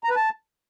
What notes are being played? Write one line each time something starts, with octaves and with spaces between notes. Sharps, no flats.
A#5
B4
A5